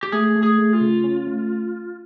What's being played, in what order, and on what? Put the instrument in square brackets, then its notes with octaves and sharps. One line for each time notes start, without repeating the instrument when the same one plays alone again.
[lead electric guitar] G4
[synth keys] A3 [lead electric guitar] G#4
[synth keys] A3
[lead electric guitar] G#4
[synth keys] A3
[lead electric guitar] F4
[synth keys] C#3
C#4
A3